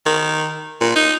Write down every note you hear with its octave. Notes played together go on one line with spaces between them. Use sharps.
D#3
A#2
D#4